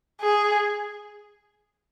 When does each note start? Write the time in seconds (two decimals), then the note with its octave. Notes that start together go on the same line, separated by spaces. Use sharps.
0.22 G#4